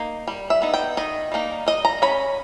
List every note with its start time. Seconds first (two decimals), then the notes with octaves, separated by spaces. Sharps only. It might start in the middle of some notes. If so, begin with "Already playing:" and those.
Already playing: A#3 D#4
0.28 G3
0.50 E5
0.62 B3 D#4
0.74 G5
0.97 D#3 D#5
1.32 G3 A#3 D#4
1.66 G3 D#5
1.85 A#5
2.02 C#4 B5